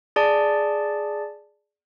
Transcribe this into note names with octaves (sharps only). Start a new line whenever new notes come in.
G#4 D5 A5